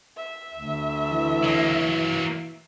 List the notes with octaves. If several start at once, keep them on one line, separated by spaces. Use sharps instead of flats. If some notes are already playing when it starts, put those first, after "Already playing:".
E5
D2
E3
F#3 A#3